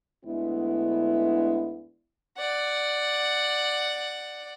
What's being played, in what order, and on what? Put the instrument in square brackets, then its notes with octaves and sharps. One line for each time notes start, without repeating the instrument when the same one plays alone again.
[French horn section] D2 D3 G#3 B3 E4
[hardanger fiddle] D5 F#5